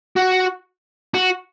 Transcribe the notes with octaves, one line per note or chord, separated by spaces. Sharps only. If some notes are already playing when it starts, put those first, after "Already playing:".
F#4
F#4